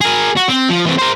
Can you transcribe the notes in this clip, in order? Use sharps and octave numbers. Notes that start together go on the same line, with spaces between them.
G#4 A#4
F#4
C4
F3
E3 C4
A#4 C5